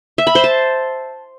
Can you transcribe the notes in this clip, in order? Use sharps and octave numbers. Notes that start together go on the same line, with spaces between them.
E5
B5
C5
A5